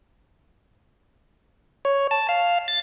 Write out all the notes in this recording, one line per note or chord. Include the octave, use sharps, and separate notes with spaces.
C#5
A5
F5
A6